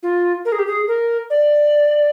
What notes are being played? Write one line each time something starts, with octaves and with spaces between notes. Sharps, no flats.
F4
A#4
G#4
G4
G#4
A#4
D5